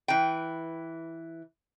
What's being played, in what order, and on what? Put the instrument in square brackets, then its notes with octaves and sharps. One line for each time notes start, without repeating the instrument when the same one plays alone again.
[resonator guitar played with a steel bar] E3 G5